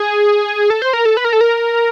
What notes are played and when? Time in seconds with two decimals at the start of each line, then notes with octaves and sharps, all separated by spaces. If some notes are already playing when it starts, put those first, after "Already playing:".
Already playing: G#4
0.70 A4
0.82 C5
0.93 A#4
1.05 A4
1.17 B4
1.25 A#4
1.33 A4
1.41 A#4